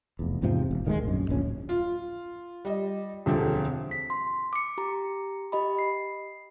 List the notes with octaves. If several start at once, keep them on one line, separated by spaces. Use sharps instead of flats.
F1 E2
E2 G#2 C3 F3
E1
D1 D#3 G3 G#3
A#1 F#2
D1 A#1 C#4
F4
G3 D#5
E1 D2 F3 C4 G4 A4
B6
C6
D6 C#7
G4 A#5
G4 D#5 B5
C7